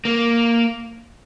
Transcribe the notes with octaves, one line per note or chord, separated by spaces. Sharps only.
A#3